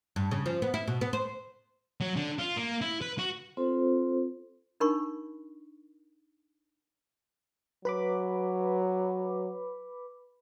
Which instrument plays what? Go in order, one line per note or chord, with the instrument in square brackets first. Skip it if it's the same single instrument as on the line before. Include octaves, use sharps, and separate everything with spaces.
[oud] G2
C#3
F3
B3
E4
B2
B3
C5
[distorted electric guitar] F#3
D3
F4
A#3
E4
B4
F#4
[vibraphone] C4 F4 A4 C5
[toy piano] D4 D#4 A#4 B5 C#6
[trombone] F#3 [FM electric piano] B4 B5 D6